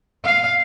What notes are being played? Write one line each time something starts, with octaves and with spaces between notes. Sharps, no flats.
F5